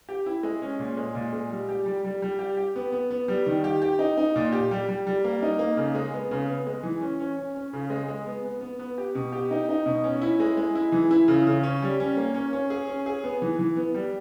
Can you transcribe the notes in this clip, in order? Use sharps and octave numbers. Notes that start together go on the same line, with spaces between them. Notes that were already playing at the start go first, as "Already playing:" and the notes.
G4
E4
G#3
C#4
A#2
G#3
A#2
G#3
G3
G4
G3
G3
G3
G4
G4
B3
B3
B3
G3
D#3
G4
G4
D#4
D#4
A#2
G4
G3
G3
G3
A#3
D#4
A#3
C#3
G#3
B3
C#3
B3
G#3
E3
C#4
C#4
C#4
C#4
C#3
G#3
G#3
B3
B3
B3
B3
G4
B2
G4
D#4
D#4
B2
C#4
E4
G#3
G#3
E4
E3
E4
C#3
C#3
C#4
G3
C#4
A#3
C#4
C#4
G#4
C#4
G#4
B3
E3
E3
B3
G3